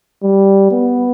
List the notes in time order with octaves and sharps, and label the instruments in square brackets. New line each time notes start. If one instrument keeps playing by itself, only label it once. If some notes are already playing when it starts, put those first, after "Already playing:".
[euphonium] G3
B3